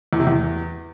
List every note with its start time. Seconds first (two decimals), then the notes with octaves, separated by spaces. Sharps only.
0.13 E2
0.20 C3
0.27 E2